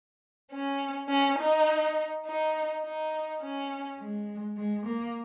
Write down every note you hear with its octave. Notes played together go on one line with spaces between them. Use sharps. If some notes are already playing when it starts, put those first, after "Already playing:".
C#4
C#4
D#4
D#4
D#4
C#4
G#3
G#3
A#3